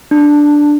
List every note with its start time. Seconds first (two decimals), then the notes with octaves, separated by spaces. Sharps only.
0.11 D4